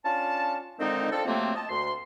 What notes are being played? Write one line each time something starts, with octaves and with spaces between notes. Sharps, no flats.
C#4 D4 F4 A5
D3 D#3 F3 G#3 C4 D#4
C4 D4 F4 A4
C3 F3 F#3 A3 A#3 C4
D#5 A5
D2 C6